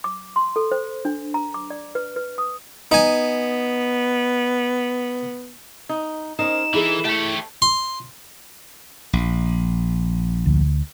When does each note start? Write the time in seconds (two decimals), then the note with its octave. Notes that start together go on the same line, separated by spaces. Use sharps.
0.04 D6
0.36 C6
0.56 A4
0.72 C5
1.05 D4
1.34 A#5
1.54 D6
1.70 D5
1.95 B4
2.16 B4
2.38 D#6
2.92 B3 D#4 G#5
5.89 D#4
6.39 C#4 D#4 A#4 C5 E7
6.74 E3 E4 G#4 A4
7.05 A3 G4 C#5
7.62 C6
9.13 A#1
10.46 D2